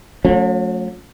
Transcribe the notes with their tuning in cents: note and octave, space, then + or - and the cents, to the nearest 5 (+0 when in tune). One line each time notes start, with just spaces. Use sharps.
F#3 -45 A3 +0 C#4 +5